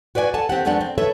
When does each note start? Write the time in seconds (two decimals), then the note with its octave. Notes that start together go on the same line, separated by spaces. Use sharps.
0.15 F#4 B4 D5 F#5 G#5
0.34 A4 F#5 G#5 A5
0.49 D#2 C4 G4 F#5
0.65 F2 G#3 A3 B3 D4 F#5
0.81 C4
0.98 A4 B4 C#5 E5